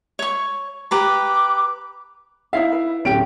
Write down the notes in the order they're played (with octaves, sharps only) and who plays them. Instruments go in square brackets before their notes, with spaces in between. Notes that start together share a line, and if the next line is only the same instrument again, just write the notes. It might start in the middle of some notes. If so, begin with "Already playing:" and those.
[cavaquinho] C#5 C#6
[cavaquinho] G4 B4 A#5 [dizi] D6
[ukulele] D#4 C#5 F5 [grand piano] E4 E5
[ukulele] B4
[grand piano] D1 D7 [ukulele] C#4 G4